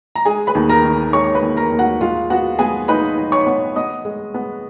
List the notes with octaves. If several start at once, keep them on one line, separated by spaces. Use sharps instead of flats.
A#5
G#3 G#4 G#5
B4 B5
D#2
A#4 A#5
D#3
G#3 C#5 C#6
B4 B5
D#2
A#4 A#5
D#2
F#4 F#5
G#3 F4 F5
B3 F#4 F#5
B3 G#4 G#5
D#4 B4 B5
D#4
C#5 C#6
B3
B3 D#5 D#6
G#3
B3